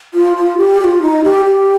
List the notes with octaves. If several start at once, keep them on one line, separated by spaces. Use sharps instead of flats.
F4
F4
G4
G4
F4
D#4
G4
G4